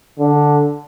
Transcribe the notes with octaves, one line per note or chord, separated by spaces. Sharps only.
D3